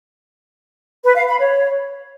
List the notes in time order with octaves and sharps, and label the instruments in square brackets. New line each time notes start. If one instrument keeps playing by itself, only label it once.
[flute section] B4
F5
B5
C#5